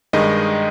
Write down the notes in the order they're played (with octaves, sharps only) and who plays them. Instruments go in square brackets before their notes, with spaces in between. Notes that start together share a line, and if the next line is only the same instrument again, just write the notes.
[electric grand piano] G2 D#3 G#3 D#5